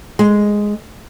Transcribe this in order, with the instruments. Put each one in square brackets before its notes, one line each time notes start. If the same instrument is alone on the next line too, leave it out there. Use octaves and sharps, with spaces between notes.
[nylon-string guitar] G#3